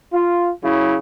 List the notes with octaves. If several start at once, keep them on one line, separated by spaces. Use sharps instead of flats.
F4
C#3 F#3 E4